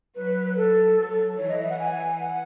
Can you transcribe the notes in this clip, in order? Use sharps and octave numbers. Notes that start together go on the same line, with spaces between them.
F#3 B4
A4
F#3
E3 C#5
D#5
E5
F#5
G#5
F#5